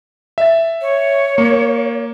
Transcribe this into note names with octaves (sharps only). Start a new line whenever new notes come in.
E5 A6
C#5
A#3